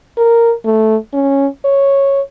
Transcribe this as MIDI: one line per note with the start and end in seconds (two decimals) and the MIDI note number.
0.17 0.54 70
0.65 0.97 57
1.13 1.47 61
1.65 2.21 73